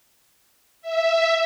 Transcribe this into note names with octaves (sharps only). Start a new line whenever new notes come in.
E5